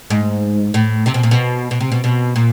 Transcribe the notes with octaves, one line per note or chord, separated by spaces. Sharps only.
G#2
A2
C3
B2
A#2
B2
B2
C3
B2
B2
A#2